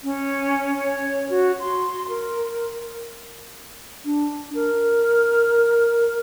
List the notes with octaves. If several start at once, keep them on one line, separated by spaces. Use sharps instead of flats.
C#4
C#5
F#4
C6
A#4
D4
A#4